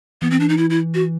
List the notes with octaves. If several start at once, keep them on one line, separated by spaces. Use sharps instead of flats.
E3 B3
C4
D4
D#4
E4
E4
F#4